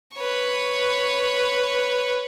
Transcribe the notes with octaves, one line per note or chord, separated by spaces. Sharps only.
B4 C#5